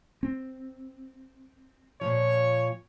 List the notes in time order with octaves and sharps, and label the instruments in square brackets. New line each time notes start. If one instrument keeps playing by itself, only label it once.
[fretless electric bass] C4
[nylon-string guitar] A#2 F3 [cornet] C#5